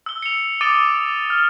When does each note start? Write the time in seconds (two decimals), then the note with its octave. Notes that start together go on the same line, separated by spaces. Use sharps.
0.06 E6 G7
0.23 C#7 F7
0.61 D6 D#6 A6 D7 D#7 G7
1.30 F6